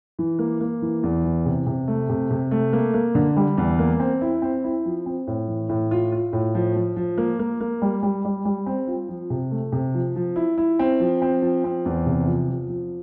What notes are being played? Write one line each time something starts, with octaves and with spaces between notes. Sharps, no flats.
E3
A#3
A#3
E3
E2
E3
C3
C3
A3
C3
C3
A3
A#3
A#3
D3
G3
E2
A#3
C4
E4
C4
E4
F3
C4
A2
E3
A2
F4
F4
A2
F3
F3
F3
A#3
A#3
A#3
G3
G3
G3
G3
C4
F4
F3
C3
A3
C3
F3
F3
E4
E4
C4
F3
C4
F3
C4
E2
C3
F3
F3
F3